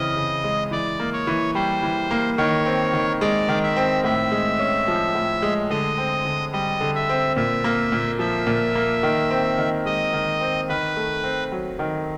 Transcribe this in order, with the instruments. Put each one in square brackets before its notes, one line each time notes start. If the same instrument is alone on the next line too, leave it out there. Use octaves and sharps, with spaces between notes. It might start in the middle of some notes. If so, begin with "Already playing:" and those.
Already playing: [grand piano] C#3 E3 C4 [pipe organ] D#5
[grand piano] C#3
G#3
[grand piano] E3 [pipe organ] D5
[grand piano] A#3
[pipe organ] C#5
[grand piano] E3
[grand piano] G3 [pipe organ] C5
[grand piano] E3
A#3
[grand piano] D#3 [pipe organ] C#5
[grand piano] C4
D#3
[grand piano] G#3 [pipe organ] D5
[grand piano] D#3
[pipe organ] E5
[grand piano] C4
[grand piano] A2 [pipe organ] E5
[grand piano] G#3
C#4
F3
A2
G#3
[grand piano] D3 [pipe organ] D#5
[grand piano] C4
D3
[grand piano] G3 [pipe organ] D#5
[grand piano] D3
[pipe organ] E5
[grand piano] C4
[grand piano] A#2 [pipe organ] E5
[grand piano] A#3
A#2
[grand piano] F3 [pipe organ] E5
[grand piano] A#2
A#3
D#3
C4
D#3
[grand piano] G#3 [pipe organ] D#5
[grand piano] D#3
C4
[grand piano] D#3 [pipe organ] B4
[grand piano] A3
C4
F#3
D#3